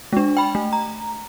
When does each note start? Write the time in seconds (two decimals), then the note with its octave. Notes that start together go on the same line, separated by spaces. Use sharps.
0.13 G#3 D4
0.37 G5 B5
0.55 A3
0.73 A#5